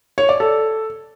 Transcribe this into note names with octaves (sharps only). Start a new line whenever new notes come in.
C#5
D5
A4